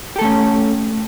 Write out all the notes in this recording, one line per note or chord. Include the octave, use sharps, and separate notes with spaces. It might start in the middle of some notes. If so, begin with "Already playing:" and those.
A3 C#4 G4 A4